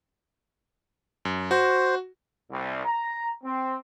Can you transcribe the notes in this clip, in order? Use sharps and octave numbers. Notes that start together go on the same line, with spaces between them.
F#2
F#4 C5
C2
A#5
C4